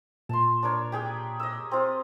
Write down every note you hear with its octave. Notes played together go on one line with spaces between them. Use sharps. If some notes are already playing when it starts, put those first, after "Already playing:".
A#2 A5 C6
D4 A#4 C#5
G4 G#4 G5
D#5 E6
C4 F4